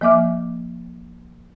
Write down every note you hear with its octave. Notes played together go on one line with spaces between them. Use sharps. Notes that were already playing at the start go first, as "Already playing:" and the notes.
F3 A#3 E5 D6 F6